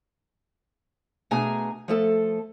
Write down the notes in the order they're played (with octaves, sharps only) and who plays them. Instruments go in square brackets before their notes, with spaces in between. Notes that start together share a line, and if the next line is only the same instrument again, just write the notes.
[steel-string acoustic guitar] B2 A3 D4 G#4 G#5 A#5
F3 A3 A4